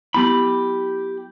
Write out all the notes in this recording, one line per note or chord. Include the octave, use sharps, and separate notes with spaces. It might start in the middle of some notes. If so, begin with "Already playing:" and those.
F#3 B3 E4 G4 B5